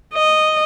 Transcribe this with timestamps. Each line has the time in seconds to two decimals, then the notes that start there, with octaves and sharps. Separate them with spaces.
0.14 D#5